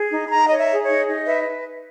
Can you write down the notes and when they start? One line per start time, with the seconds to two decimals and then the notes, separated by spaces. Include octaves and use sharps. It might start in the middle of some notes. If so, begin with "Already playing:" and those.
Already playing: G#4
0.12 D#4
0.27 B5
0.31 D#4 A#5
0.47 C#5 D#5
0.57 E5
0.69 G#4
0.82 C#5
0.89 D#4
1.07 D#4
1.26 B4 E5